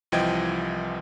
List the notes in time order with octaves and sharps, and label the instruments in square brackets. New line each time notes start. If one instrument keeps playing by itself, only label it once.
[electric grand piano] C2 E3 F3 D#5 G5 G#6